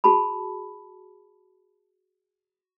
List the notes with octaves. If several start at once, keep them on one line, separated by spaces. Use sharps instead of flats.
F#4 G#4 A5 B5